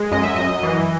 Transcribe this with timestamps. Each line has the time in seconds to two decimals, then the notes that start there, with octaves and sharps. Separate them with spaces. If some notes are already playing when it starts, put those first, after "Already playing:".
Already playing: G#3
0.11 F#2 D#5
0.23 E5
0.36 F#2 D#5
0.63 E3